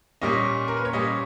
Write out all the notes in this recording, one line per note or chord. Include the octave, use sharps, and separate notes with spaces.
A#2 G3 A#3 C#4 D#5
A#4
B4
C#5
A#2 G3 A#3 C#4 D#5